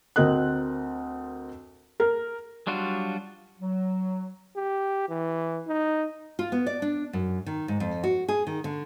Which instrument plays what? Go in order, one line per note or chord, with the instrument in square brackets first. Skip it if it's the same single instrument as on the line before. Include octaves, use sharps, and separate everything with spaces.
[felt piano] D2 C4 A#4 D#5 F#6
A#4
[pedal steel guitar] F#3 G3 D4 F4 F#4
[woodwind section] F#3
[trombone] G4
E3
D#4
[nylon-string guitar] F4
B3
D5
D4
F#2
D#3
G#2
F2
F#4
G#4
D#3
D3